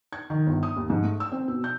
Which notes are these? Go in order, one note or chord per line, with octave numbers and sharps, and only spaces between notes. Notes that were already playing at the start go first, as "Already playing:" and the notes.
G#6
D#3
G1
D#6
D#2
G#2
A3
E6
C4
B2
G6